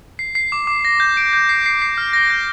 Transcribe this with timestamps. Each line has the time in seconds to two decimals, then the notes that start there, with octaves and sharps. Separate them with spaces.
0.19 C7
0.35 C7
0.52 D6
0.67 D6
0.85 A#6
1.00 G6
1.17 D7
1.33 G6
1.49 C7
1.66 C7
1.82 C7
1.98 F6
2.13 A#6
2.30 G6